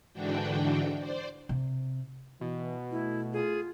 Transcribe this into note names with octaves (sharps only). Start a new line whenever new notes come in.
G#2 D3 E3 D4 F#4 G5
C5 D5
C3
B2 E3
A3 E4
F4 G#4